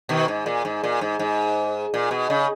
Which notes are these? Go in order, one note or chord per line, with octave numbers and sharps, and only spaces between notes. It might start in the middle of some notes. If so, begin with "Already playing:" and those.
B2 D#3
G#2
A#2
G#2
A#2
G#2
G#2
A#2
B2
C#3